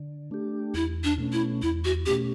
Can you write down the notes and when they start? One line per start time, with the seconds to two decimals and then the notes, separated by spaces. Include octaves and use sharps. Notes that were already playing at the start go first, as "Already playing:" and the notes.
Already playing: D3
0.31 A3 D4 G4
0.74 E2 E4
1.04 D4
1.18 B2 A3 C#4
1.33 E4
1.62 E2 E4
1.85 F#4
2.06 B2 A3 C#4 G4